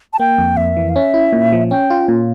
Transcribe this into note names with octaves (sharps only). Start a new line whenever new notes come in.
A5
A#3 G5
F2
F2 E5
E3
F5
C#4 E5
E4
A#2
F3
C#4 G5
F4
A#2